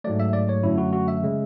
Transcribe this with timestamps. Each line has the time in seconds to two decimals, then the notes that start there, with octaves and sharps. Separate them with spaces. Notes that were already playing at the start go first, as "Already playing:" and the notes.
0.04 G#2 F#3 A3 D5
0.20 E5
0.33 D5
0.49 C#5
0.63 F#2 D3 F#3 A3 E4
0.78 F#4
0.93 F#4
1.08 E5
1.23 C#3 G#3